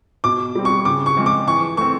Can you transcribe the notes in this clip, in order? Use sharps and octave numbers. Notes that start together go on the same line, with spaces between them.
B2 D6
G3 C4
C#6
C#3 D6
C#6
F3 G#3 C4
D6
E3 C#6
A3 C4 C#6